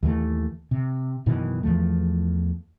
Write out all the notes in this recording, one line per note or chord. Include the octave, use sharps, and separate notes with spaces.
D#2 E3 G3 A3
C3
F#2 B2 D#3 E3
E2 E3 F3 A3